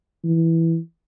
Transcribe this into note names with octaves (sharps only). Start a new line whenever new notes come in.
E3